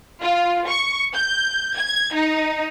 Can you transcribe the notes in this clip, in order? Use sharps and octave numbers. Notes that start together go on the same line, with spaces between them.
F4
C#6
G6
G#6
D#4